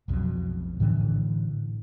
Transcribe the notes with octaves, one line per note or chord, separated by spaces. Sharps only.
B1 F2 B2 F#3
A2 D3 E3 D4